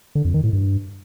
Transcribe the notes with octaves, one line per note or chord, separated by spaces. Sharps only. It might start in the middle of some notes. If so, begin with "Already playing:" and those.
D3
F2
D#3
A2
G2